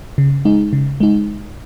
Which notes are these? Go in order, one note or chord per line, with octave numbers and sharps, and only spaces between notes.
C#3
G#3 D#4
C#3
G#3 D#4